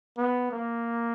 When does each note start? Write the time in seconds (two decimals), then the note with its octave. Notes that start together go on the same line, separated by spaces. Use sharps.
0.17 B3
0.51 A#3